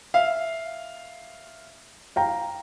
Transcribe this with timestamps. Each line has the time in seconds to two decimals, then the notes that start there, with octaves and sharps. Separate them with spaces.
0.14 E5 F5
2.16 F5 G5 A#5